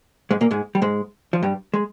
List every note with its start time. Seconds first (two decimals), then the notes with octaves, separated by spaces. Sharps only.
0.31 G#2 G#3
0.41 A#2 A#3
0.51 G#2 G#3
0.75 G3
0.82 G#2 G#3
1.33 F3
1.43 G2 G3
1.74 G#3